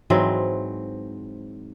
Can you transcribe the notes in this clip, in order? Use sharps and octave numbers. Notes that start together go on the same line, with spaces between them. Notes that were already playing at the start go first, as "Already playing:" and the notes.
G#2 E3 F#3 C4